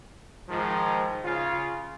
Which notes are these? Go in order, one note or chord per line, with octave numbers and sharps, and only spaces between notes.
G#2 D#3 F3
C#3 F4